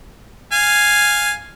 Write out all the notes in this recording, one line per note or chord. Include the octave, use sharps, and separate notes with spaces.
F5 G#5